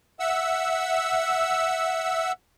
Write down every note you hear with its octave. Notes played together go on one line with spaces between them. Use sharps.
E5 F#5 E6